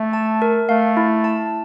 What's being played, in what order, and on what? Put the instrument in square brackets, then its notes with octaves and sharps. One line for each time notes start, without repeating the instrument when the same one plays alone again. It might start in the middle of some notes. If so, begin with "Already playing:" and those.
Already playing: [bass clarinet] A3
[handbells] A5
A#4
[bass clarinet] A3 [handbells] F5
[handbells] E4
A5